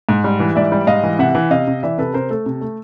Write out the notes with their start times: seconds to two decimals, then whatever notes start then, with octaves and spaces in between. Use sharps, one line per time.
0.09 G#2
0.24 G3
0.40 E3
0.55 G#2 D5 E5
0.72 G3
0.87 G#2 D#5 F5
1.03 E3
1.19 C3 E5 F#5
1.35 E3
1.50 C3 D#5 F5
1.68 C3
1.83 E3 D5 E5
1.98 C3 A4 B4
2.14 C3 A#4 C5
2.30 A3 A4
2.46 C3
2.61 A3